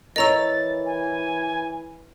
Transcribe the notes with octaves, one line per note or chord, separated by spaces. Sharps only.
E3 A#4 C#5 D#5 A#5 E6 A6
G#5